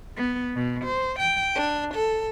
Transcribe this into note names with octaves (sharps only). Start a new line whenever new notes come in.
B3
B2
C5
G5
D4
A4